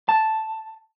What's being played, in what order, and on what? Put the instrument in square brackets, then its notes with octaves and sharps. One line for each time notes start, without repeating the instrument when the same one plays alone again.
[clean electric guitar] A5